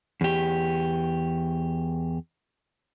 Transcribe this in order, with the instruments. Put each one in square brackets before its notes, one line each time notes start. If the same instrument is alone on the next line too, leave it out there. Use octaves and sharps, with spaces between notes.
[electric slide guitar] E2 G4